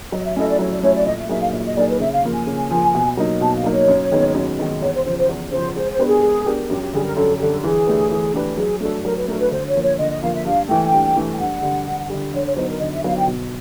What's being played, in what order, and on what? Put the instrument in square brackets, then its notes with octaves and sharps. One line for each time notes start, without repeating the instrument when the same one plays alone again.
[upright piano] F#3 [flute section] D#5
[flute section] E5
[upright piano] A3 C#4 E4 A4 [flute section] D#5
[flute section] D5
[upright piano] F#3 [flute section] C#5
[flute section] D5
[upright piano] A3 C#4 E4 A4 [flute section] C#5
[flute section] D5
[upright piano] A#2 [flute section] D#5
[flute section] E5
[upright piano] F#3 A#3 D#4 G#4 [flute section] E5
[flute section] F5
[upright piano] A#2 [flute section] E5
[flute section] D#5
[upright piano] F#3 A#3 D#4 G#4 [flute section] D5
[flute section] B4
[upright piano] C#3 [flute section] E5
[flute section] F5
[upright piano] F3 A#3
[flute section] G#5
[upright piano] C#3
F3 A#3
B2
F#3 A#3 D#4
[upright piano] B2 [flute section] A5
[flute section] F5
[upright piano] F#3 A#3 D#4
[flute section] C#5
[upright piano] F#2
D#3 G#3 B3 D#4
F#2
D#3 G#3 B3 D#4
[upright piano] E2 [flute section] C#5
[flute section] C5
[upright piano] C#3 F3 [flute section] C5
[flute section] C5
[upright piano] E2
[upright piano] C#3 F3 [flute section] C5
[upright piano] G#3 [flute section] C5
[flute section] C5
[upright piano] B3 D4 G4 A#4
[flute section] G#4
[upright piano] G#3
B3 D4 G4 A#4
[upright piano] F#2 [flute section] G4
[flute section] G4
[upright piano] D3 G3 [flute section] G#4
[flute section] A#4
[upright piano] F#2 [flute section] A4
[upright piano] D3 G3 [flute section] A4
[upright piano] E3 [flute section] G#4
[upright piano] A3 D4 G4 B4
E3
A3 D4 G4 B4
[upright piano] F#3 [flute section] G#4
[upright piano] A3 D4 F#4 [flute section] A4
[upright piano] F#3 [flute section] A#4
[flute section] B4
[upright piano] A3 D4 F#4 [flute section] A#4
[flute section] B4
[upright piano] D3 [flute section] C5
[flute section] C#5
[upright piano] F3 A#3
[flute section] C#5
[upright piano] D3 [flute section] D#5
[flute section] D#5
[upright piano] F3 A#3 [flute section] F5
[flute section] E5
[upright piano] G2 [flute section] F5
[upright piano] E3 A3 [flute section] G5
[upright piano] G2
E3 A3
[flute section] G5
[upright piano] G2 [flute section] F#5
[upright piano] D3 G3
G2
D3 G3
[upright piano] D3 [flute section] C#5
[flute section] C#5
[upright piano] F#3 B3 D#4 [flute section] C5
[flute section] A#4
[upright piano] D3 [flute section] D#5
[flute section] E5
[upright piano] F#3 B3 D#4 [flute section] F5
[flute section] G5
[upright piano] B2